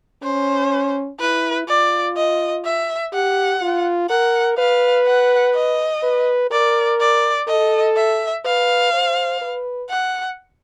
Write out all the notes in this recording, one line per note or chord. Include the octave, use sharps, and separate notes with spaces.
C#4 C5
E4 B4
F4 D5
D#5
E5
G4 F#5
F4
A#4 F#5
B4 F5
F#5
D#5
B4
A#4 D5
D5
A4 D#5
E5
B4 F5
C5
B4
F#5